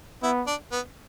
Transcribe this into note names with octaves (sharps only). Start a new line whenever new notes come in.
B3 E4
D4
B3